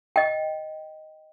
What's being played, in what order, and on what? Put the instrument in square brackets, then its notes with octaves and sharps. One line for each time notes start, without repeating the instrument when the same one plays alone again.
[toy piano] D#5 G5